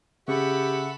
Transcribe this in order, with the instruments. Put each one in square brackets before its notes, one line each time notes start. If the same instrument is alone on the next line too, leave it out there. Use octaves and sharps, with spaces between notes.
[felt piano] C#3 [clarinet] G4 [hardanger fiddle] A4 B5 [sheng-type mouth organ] E5 F#5 C#6